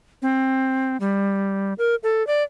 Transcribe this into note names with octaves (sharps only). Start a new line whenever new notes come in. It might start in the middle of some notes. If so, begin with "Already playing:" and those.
C4
G3
A#4
A4
D5